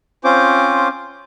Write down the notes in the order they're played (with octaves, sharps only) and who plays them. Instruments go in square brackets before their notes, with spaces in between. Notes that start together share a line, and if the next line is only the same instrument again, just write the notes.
[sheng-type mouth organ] C4 C#4 F4 C5 D6